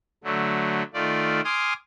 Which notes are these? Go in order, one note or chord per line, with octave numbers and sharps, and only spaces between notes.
D3 F#3 A3
D#3 A3 F4 D5
G#5 C6 D6 D#6 F6